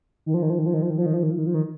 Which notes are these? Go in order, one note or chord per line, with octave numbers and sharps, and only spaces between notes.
D#3
F3
D#3
F3
D#3
F3
D#3
F3
D#3
F3
D#3
F3
D#3
F3
D#3
F3
D#3